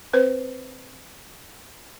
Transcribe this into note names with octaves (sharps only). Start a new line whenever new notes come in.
C4 B4 C5